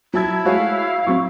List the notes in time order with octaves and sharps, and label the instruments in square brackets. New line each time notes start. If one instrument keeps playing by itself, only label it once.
[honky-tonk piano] F#3 A5 G#6 [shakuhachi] E4
[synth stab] G#3 A3 G#4 [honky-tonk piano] F#4 C#5 [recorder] F5
[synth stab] A2 F#3 C4 [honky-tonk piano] C#6